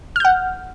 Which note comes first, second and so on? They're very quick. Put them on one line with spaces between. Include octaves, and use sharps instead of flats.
F6 G6 F#5